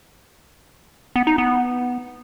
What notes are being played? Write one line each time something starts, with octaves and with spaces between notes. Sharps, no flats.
B3
D#4
B3